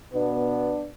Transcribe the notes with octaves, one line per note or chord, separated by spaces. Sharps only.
B2 B3 D4